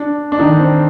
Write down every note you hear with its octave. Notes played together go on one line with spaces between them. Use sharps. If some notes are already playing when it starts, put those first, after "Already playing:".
Already playing: D4
D4
D#3 D#4
C4